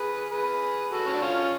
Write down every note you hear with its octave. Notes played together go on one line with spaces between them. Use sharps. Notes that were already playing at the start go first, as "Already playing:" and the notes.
Already playing: G#4 B4
G#4 B4
F#4 A4
C#4
D4
C#4 F4